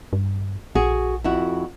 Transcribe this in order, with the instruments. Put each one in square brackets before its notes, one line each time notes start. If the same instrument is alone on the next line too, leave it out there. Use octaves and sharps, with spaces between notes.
[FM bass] G2
[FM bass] A#1 [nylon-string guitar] F#4 G#4
[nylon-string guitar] F2 E4 F#4